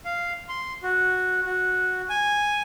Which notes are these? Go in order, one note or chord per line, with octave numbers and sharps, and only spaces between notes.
F5
C6
F#4
F#4
G#5